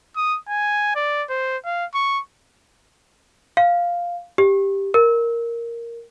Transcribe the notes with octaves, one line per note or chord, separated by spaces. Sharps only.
D#6
G#5
D5
C5
F5
C#6
F5
G4
A#4